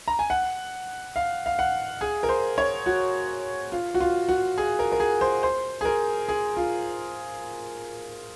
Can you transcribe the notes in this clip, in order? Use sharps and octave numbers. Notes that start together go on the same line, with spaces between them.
A#5
G#5
F#5
F5
F5
F#5
G#4
A#4
C5
C#5
F#4
F4
F#4
F4
F#4
G#4
A#4
A#4
G#4
C5
C5
G#4
A#4
G#4
F4